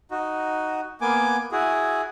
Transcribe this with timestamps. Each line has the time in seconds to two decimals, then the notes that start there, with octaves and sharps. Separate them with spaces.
0.11 D#4 F#4
1.01 A#3 B3 G#5 D6
1.52 E4 F#4 G#4